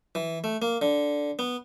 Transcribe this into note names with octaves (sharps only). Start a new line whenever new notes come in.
E3
A3
A#3
D3
B3